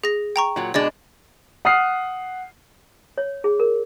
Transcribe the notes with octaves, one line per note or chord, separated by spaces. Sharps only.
G#4 A#6
G5 A#5 C#6
A#2 F#3
B2 G#3 D4 D5 D#5 A6
F#5 D#6 F6 C7
C#5
G#4
A#4